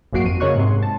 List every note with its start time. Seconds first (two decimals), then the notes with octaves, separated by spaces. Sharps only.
0.13 G#1 F#2 A#3 F#4 C7 D7
0.24 F2 D#7
0.40 C#3 A#3 C#5 D#5 C#6 F#6
0.56 G#2 C3 C6
0.83 A5